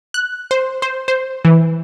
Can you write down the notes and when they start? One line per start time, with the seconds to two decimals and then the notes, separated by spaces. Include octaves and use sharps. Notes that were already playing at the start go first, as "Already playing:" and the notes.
0.14 F#6
0.51 C5
0.82 C5
1.08 C5
1.45 E3